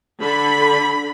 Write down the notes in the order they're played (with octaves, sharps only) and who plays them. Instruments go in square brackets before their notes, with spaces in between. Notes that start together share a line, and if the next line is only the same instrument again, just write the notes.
[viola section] D3 B5